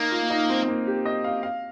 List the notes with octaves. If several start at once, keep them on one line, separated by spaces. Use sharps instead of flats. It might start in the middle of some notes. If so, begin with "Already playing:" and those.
Already playing: A#3 D#4
F4
D#4
C4
A#3
G4
D#5
F5
F5